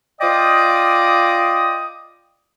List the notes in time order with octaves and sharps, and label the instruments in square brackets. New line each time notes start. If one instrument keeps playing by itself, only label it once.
[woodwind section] F4 D5 D#5 G5 D6 D#6